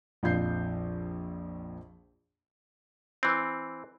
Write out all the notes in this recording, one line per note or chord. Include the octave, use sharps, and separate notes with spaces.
A#1 F2 F4 G6 C7
E3 C4